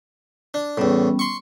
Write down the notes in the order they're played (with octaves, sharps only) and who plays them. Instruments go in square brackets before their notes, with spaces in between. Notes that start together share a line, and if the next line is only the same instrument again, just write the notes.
[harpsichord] D4
[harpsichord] E2 A2 [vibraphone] G3 B3 C#4
[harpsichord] C6 C#6